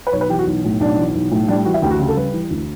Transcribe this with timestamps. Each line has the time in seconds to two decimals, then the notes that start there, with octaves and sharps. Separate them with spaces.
0.07 B4
0.13 B1 C#5
0.21 B4
0.29 E3 G4
0.39 F#4
0.46 B1
0.64 A2
0.80 B1 D4
0.98 E3
1.15 B1
1.31 A2
1.48 G3 D4
1.65 E3 F#4
1.74 E5
1.82 D2 G4
1.91 F#4
1.99 C#3 G4
2.08 A4
2.17 G3 B4
2.33 E3
2.50 D2